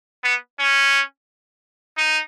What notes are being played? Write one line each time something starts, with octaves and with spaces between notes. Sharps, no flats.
B3
C#4
D#4